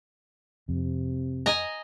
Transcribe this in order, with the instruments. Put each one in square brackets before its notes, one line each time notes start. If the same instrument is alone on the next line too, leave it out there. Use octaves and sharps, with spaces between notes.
[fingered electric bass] F2 [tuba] C3
[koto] D#5 G#5 A#5